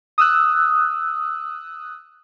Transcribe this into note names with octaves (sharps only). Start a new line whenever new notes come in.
D#6 E6 F#6